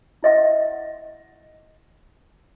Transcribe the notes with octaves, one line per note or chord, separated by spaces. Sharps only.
E4 D#5 E5 F#5